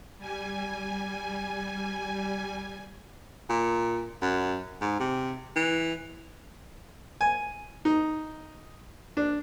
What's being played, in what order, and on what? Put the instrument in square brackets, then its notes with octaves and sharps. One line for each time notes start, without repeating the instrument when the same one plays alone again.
[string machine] G3 G#5
[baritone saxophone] A#2
F#2
G#2
C3
E3
[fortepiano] G#5
D#4
D4